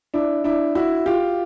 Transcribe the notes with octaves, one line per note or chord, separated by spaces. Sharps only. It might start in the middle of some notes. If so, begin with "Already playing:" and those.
D4 E4
D4 E4
E4 F#4
F4 G4